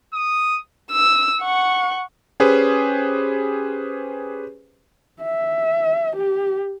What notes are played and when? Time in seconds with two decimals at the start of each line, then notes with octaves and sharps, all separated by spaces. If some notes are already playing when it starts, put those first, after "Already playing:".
0.14 D#6
0.92 E6
1.42 F#5 C#6
2.40 C#4 G4 G#4 B4 C5
5.23 E5
6.16 G4